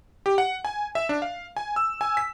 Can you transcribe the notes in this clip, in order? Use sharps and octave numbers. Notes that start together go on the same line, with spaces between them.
G4
F#5
G#5
E5
D4
F5
G#5
E6
G#5
B6